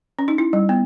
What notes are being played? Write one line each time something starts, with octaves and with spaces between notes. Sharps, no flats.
C#4
D#4
E4
G3
B3